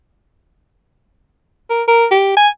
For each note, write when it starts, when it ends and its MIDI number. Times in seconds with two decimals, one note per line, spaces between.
1.70 1.83 70
1.88 2.06 70
2.11 2.34 67
2.37 2.48 80